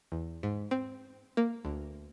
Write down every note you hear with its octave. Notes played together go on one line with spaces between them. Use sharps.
E2
G#2
C4
A#3
D2